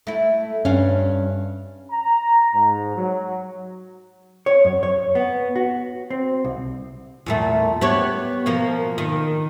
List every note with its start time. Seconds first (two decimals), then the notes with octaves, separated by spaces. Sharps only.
0.07 A3 E4
0.65 G2 C#4 F5
1.91 A#5
2.54 G#2
2.96 F#3
4.46 C#5
4.65 F#2
4.83 C#5
5.15 B3
5.56 F#4
6.10 C4
6.44 C2
7.26 E2 A#2 A3
7.81 B3 G4 C#5
8.46 B2 F3 A#3
8.98 D#3